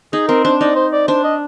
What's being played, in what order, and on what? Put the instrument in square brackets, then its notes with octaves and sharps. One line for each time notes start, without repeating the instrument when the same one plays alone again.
[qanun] D#4 [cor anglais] G#4
[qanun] C4 [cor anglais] A#4
[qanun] D4 [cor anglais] C5
[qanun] D#4 [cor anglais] D5
[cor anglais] C5
D5
[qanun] D4 [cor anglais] C5
[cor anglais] D#5